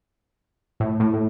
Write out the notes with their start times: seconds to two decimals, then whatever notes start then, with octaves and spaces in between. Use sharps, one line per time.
0.80 A2
1.00 A2
1.13 A2